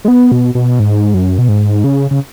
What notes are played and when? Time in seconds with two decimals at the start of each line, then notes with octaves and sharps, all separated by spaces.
0.05 G#3
0.08 B3
0.32 B2
0.55 B2
0.79 G#2
1.14 F#2
1.38 B2
1.49 G#2
1.84 C#3
2.11 C#3